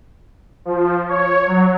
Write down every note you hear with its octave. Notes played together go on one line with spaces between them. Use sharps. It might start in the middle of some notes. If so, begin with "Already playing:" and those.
F3
C#5
F#3